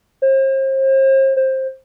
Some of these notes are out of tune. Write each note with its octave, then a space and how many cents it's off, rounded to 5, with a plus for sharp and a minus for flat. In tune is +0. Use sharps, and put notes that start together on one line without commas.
C5 +40
C5 +15